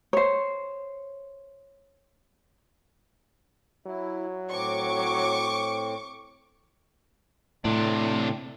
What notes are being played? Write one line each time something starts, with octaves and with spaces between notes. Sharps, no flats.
C5 C#5
F#3 E4
A2 C4 C#6 D6
A2 C3 D4